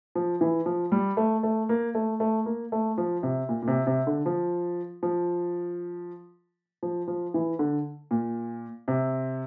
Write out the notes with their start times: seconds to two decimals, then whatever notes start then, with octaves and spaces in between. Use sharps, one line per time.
0.15 F3
0.41 E3
0.66 F3
0.92 G3
1.17 A3
1.43 A3
1.69 A#3
1.95 A3
2.20 A3
2.46 A#3
2.72 A3
2.98 F3
3.23 C3
3.49 A#2
3.62 A#2
3.67 C3
3.87 C3
4.07 D3
4.26 F3
5.03 F3
6.83 F3
7.08 F3
7.34 E3
7.59 D3
8.11 A#2
8.88 C3